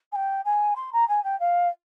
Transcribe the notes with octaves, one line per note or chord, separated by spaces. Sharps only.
G#5
G5
G#5
C6
A#5
G#5
G5
F5